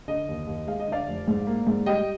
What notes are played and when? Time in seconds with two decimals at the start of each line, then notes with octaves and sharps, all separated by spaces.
0.08 D3 D#5
0.28 D#2
0.47 D#2
0.67 G#3 F5
0.80 D#5
0.88 D3 D5 F5
1.08 F1
1.28 G#2
1.47 A#3
1.67 G#2
1.86 G3 D#5 G5